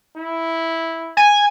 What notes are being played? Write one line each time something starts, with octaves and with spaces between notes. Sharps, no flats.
E4
G#5